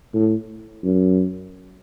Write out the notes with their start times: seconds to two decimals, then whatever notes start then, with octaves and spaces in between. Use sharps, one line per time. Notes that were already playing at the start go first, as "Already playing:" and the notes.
0.14 A2
0.83 F#2